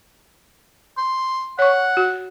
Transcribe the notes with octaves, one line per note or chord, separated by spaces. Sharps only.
C6
C#5 F#5 C#6
F#4